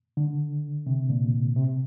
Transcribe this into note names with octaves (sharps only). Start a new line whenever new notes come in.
D3
C3
A#2
C3